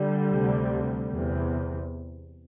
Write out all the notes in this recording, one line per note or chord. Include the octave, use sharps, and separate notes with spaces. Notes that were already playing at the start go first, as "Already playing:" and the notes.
Already playing: D3 G3
D2 C3
E2 C3